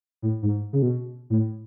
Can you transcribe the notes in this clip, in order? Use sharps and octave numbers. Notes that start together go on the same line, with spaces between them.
A2
G#2
C#3
B2
A2